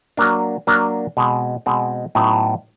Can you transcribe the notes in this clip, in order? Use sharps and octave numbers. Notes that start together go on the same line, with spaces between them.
F#3 A#3 D4
F#3 A#3 D4
B2 G#3 C4
B2 G#3 C4
A2 F#3 B3 D#4